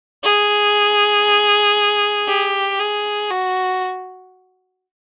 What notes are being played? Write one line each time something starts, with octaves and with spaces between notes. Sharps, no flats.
G#4
G4
G#4
F#4